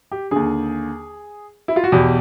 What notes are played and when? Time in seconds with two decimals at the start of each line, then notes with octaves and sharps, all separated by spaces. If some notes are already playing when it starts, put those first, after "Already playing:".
0.12 G4
0.31 D#2 D3 G#4
1.68 E4
1.76 F4
1.84 F#4
1.92 E2 B2 G4